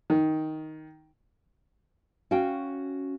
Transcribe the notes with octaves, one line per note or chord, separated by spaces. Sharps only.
D#3
C#4 F#4 F5 G5